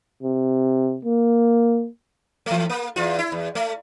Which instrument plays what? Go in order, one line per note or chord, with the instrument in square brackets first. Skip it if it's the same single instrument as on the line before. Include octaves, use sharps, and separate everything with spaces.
[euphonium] C3
A#3
[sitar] E3 A3
A#3
E2 F4
E4
E2
A3